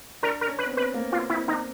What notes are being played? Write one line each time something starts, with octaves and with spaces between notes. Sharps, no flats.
D4 A#4
A#4
C#4
B4
B3
C4
B4
A#3
F4
C4 E4
D#4